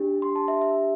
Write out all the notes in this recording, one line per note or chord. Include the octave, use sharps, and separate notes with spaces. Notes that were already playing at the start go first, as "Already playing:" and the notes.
Already playing: D4 G4
C6
A5
E5
E5